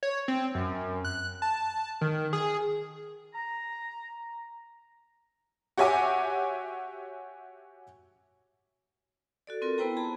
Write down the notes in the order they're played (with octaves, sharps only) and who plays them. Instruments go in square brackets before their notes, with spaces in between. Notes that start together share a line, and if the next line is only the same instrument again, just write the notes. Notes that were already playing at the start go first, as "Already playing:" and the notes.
[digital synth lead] C#5
C4
F#2
F#6
A5
D#3
G#4
[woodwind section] A#5
[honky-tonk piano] F#4 G4 C#5 E5 G#5 D6
[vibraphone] F#4 A4 D5
C4 F4 A4 A#4
B3 E4 B4 C5 G5 A#5
G#4 A5 B5